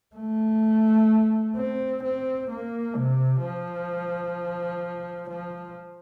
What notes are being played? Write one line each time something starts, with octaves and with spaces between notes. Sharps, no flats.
A3
C4
C4
A#3
C3
F3
F3